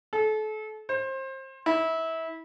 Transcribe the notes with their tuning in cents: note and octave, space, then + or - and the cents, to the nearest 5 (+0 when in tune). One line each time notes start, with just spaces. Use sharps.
A4 -35
C5 +25
E4 -25